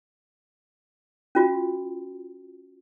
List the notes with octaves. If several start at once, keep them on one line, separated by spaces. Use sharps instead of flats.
C#4 F4 F#4